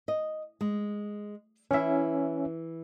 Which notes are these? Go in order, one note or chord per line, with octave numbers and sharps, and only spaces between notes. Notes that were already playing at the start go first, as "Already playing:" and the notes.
D#5
G#3
E3 C#4 E4 E5